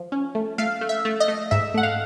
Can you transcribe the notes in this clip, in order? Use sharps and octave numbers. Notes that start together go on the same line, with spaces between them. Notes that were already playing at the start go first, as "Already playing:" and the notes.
Already playing: F3
C#4
A3
A3 F5
A3
E5
A3
D#5
A3
G#2 E5
A3 F#5
F5